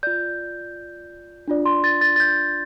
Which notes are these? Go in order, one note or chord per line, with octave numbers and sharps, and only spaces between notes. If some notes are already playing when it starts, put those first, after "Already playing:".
F4 D5 G6
D4 F4 D5
C6
A6
A6
A6
G6